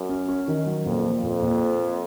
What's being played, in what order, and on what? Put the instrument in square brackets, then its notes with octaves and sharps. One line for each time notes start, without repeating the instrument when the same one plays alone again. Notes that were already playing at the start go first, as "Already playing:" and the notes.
Already playing: [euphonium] F#2
[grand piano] C#4
C#4
D#3
F#3
[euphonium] F2 [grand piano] A#2
[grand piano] F3
[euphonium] F2 [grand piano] A#2
[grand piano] A#2